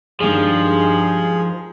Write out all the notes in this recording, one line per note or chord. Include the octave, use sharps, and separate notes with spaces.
G2 D#3 F3 G3 G#3 G#4